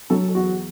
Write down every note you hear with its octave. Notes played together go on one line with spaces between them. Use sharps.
F#3 A4
A4
E2 F#4